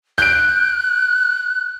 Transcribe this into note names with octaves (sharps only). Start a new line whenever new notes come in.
F#6 G6 D7